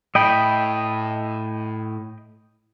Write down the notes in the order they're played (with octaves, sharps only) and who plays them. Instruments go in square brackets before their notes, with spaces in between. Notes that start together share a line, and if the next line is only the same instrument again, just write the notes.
[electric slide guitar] A2 [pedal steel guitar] D#5 G5 B5